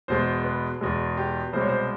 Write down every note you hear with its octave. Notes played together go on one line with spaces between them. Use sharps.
E2 B2 G#3 C5
B4
E2 B2 G#3
G4
C2 B2 G#3 C5
C#5
C5